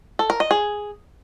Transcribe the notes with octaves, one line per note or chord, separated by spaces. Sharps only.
A4
A#4
D#5
G#4